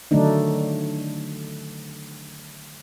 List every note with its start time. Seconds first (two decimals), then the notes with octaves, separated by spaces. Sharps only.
0.11 D3 D#3 F#3 A3 D4 D#4